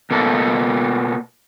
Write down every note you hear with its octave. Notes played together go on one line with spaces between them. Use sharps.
B2 A#3 A4